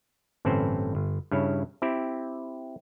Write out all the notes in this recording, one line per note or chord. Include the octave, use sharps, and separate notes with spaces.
G1 A2 E3 C4 C#4 C5
G1
G2 C#3 E4 C#5
C4 E4 G4